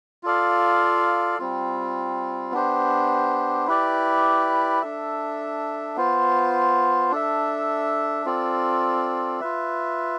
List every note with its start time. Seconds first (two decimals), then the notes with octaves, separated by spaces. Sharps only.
0.23 F4 A4 D5 F5
1.39 G3 C4 F4
2.52 B3 D4 G4 C5
3.67 E4 G4 B4 D5
4.82 D4 A4 E5
5.96 B3 F4 C5
7.11 D4 A4 E5
8.26 C4 F4 A4 D5
9.40 F4 B4 E5